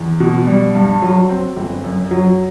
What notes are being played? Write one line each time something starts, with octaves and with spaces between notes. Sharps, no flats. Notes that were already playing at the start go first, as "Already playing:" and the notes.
Already playing: E2
B2
G3
G2
F#3
C4
G1
F#2
F#3